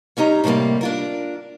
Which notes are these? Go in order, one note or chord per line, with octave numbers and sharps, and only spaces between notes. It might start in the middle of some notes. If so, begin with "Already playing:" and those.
G3 C#4 D#4 A#5
A2 C3 E3 G3 A#3
D4 F4 A#4